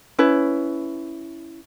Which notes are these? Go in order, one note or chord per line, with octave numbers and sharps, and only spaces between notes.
C#4 E4 B4